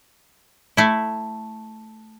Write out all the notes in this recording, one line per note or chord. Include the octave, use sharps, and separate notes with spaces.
A3 E4